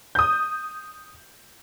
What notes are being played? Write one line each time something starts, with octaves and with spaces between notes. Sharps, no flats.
D#6 G6